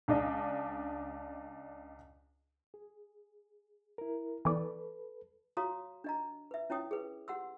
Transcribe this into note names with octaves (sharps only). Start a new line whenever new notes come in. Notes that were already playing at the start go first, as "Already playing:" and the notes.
C#2 D4 D#5
G#4
E4 A#4
E3 B3 A4 B4 D5
F#4 C#5 F5 A#5 C6 D#6
D4 D#5 A#5
B4 E5
C#4 E4 C#5 G5 D#6
G#4 B4
G4 F#5 C6 E6